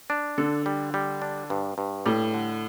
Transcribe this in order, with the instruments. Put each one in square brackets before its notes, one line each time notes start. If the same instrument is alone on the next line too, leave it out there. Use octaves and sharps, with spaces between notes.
[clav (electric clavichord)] D4
[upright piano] D3 [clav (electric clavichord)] A4
[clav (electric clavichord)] G3
G3
D4
G2
G2
[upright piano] A2 [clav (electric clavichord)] G3
[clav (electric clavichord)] D3